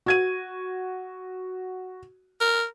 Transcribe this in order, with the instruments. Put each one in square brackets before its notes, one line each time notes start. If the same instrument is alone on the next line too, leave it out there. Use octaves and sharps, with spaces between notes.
[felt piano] F#4 G#6 D#7
[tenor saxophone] A#4